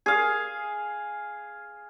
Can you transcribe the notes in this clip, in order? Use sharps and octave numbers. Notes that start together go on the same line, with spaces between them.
G#4 F5